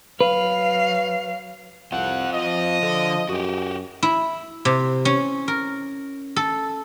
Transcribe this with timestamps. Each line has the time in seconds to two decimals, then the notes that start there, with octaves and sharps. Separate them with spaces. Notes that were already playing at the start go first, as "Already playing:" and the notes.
0.21 F#3 B4 F5
1.92 C2 C4 F4 F#5
2.32 F3 D#5
2.83 D3 A4
3.29 F#2 F#4 G4
4.03 E4
4.65 C3
5.05 C#4
5.48 A#4
6.36 A4